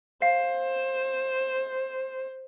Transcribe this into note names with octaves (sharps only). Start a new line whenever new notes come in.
C5 F5